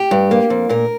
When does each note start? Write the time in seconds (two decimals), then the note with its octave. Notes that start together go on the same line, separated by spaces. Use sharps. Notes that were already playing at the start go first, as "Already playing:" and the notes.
Already playing: G4
0.11 G2
0.31 A#3
0.50 F2
0.69 A#2 A#4